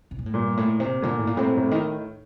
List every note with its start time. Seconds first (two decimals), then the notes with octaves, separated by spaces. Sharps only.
0.11 C3
0.19 A#2
0.26 A2
0.34 G2 A#2
0.57 A2
0.80 C3
1.02 A#2 D3
1.19 A2
1.27 A#2
1.37 A2 C3
1.57 A2
1.71 D#3